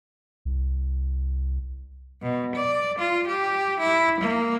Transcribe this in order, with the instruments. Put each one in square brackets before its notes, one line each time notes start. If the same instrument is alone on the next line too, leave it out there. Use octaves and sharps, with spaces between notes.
[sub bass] C2
[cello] B2
D5
F4
G4
E4
A#3